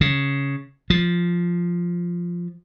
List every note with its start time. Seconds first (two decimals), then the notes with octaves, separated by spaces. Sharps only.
0.01 C#3
0.90 F3